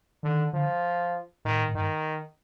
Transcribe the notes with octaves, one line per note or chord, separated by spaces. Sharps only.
D3 D#3
D3 F3
A2 D#3
A2
G2 D#3